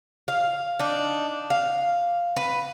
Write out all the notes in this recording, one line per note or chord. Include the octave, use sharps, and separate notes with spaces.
F5
D4 D#4
F5
B4